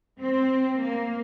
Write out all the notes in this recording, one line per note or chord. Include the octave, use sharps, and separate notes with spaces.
C4
A#3